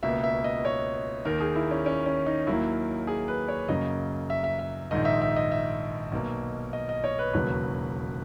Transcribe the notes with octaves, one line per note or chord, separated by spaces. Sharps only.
C#2 B2 A#3 E5
E5
D#5
C#5
D#2 D#3 A#3 A#4
G#4
E4
C#4
C#4
C#4
D#4
D#2 D#3 F#3 A#3 E4
G#4
B4
C#5
F#2 C#3 F#3 A#3 D#5
E5
E5
E5
A#1 G#2 D#3 G#3 D#5
E5
E5
D#5
E5
B1 B2 A#3
D#5
D#5
C#5
B4
E1 D#2 C#3 F#3 A#3 B4